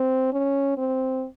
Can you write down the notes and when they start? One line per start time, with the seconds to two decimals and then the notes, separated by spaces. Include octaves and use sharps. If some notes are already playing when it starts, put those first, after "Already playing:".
Already playing: C4
0.33 C#4
0.78 C4